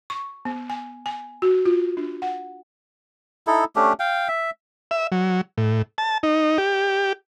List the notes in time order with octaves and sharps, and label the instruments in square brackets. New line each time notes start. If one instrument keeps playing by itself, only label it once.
[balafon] C#6
B3
G#5
G#5
F#4
F4
D4
F#5
[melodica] D#4 E4 A4
A3 C#4 D4 G4
F5 G5
E5
[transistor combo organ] E5
F#3
A2
A5
D#4
G4